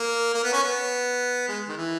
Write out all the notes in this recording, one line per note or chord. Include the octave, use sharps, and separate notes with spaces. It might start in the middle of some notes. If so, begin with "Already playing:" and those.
Already playing: A#3
A#3
B3
C#4
B3
G#3
D#3
E3